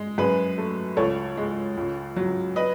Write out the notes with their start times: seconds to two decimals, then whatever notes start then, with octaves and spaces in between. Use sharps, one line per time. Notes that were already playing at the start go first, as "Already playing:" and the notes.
Already playing: G#3
0.18 F#2 G#4 B4
0.58 A3
0.97 C#2 A4 C#5
1.37 G#3
1.77 C#2
2.16 F#3
2.56 B4 D#5